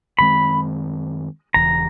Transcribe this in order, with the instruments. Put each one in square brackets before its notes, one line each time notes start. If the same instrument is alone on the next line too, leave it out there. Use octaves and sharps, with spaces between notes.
[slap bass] F#2 D#3 G#3 C4 [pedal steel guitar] B5
[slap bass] E1 E2 C#3 [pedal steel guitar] A#5